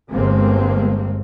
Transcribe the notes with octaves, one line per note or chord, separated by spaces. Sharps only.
G1 G2 G#3 A#3 C4